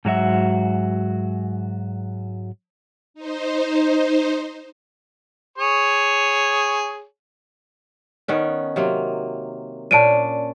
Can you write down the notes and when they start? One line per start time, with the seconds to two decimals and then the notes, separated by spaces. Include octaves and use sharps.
0.05 G#2 F#3 F#4 E5
3.14 D#4 C5
5.58 G#4 C#5
8.28 D#3 B3 C#4
8.76 C3 F#3 A#3
9.91 A#2 C#4 D4 A5 D7 D#7